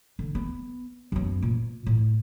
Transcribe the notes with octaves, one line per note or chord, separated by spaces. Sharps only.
D3
B3
F#2 B3
A#2
A2